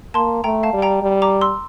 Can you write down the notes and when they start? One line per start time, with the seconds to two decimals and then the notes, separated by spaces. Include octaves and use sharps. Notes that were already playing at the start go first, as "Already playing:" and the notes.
0.14 A#3 A5 C6
0.44 A3 G5 A#5
0.63 F5 A5
0.73 G3
0.82 G5 A#5
1.02 G3
1.22 A#5 D6
1.41 C6 E6